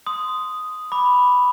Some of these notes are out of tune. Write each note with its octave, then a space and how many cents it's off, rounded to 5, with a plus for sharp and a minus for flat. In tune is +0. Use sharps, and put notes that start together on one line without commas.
C6 -20 D#6 +0
B5 +0 D6 +0